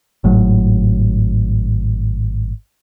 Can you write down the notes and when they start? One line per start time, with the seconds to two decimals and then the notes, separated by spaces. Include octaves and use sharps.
0.24 G#1 A2 F#3